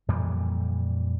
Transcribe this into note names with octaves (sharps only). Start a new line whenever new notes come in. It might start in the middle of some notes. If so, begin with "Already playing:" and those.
F2 A#2 E3 G3